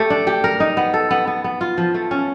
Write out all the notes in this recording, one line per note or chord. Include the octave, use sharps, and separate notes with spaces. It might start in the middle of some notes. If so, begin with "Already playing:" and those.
Already playing: A3 G4
D4
G4
A#4
D#4
B3
A4
B3
B3
B3
F4
F3
A3
C#4